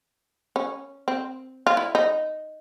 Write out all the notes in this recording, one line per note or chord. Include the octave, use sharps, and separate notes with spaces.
C#4
C4
F4
E4
D#4